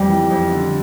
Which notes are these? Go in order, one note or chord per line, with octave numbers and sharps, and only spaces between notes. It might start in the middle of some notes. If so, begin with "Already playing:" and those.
Already playing: F2 G3
E3
F2
D3